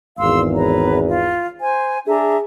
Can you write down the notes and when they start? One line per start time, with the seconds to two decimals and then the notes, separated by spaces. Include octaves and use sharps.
0.19 G#1 E2 F5 C6 E6
0.54 B4 C#5 A#5
1.07 F4
1.60 C5 G#5
2.07 D4 G#4 E5 A#5